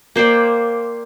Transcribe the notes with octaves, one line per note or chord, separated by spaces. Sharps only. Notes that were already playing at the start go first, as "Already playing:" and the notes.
A#3 C5 D5 G5